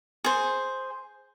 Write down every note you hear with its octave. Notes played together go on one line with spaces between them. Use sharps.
G#4 C5